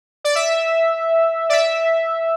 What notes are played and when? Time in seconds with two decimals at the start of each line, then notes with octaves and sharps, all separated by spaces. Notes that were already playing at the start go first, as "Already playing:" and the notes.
0.24 D5
0.35 E5
1.49 D5
1.53 E5